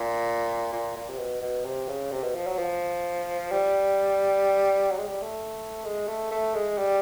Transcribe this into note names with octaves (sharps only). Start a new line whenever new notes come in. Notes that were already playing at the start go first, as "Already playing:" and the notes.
Already playing: A#2
A#2
A#2
C3
B2
B2
C3
C#3
C3
B2
F3
F#3
F3
G3
F#3
G#3
G3
A3
G#3
A3
A3
G#3
G3